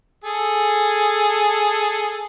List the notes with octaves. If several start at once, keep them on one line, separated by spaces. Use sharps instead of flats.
G#4 A4